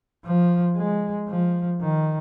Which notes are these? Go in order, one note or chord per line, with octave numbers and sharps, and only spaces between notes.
F3
G#3
F3
D#3